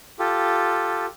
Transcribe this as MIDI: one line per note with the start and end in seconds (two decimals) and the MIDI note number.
0.19 1.06 65
0.19 1.06 67
0.19 1.06 69